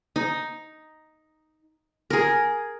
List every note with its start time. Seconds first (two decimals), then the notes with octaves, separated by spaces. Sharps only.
0.16 D#4
2.10 G#4 A#4